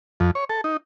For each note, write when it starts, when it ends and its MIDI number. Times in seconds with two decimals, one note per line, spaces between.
0.20 0.31 41
0.35 0.45 73
0.50 0.61 69
0.64 0.77 63